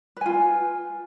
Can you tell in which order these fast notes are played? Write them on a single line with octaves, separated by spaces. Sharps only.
B4 G#5 F4